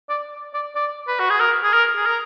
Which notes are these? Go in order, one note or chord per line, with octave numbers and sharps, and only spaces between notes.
D5
D5
D5
B4
F#4
G#4
A#4
G#4
A#4
G#4
A#4